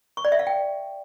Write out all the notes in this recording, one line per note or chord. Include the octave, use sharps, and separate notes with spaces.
C#6
D5
E5
F5
G5